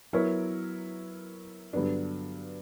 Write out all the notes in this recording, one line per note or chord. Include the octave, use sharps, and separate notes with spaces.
F#3 B3 E4 A#4 C#5
G2 D3 F#3 B3 D4